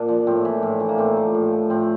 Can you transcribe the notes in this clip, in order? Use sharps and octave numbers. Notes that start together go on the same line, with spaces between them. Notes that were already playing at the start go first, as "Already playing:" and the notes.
Already playing: A#2 D4
F3
A2 C4
E3
A2
E3
A#3
A2 C4
F3
A2
F3
A2 C4